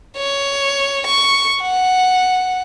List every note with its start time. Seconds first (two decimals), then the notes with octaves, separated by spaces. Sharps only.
0.17 C#5
1.07 C#6
1.62 F#5